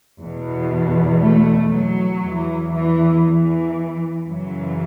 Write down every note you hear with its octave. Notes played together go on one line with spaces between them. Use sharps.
E2 B2
A3
F#3
E2 E3
E3
E3
F#2 C#3 E3 F#3